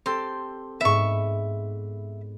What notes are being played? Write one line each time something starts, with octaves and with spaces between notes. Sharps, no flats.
C4 G4 A4 C6
G#2 B3 E5 C#6